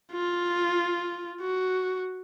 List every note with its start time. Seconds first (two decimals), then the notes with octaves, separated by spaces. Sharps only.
0.13 F4
1.41 F#4